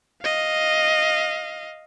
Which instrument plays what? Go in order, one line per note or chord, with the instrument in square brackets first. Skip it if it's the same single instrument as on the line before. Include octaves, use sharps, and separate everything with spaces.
[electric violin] D#5 F5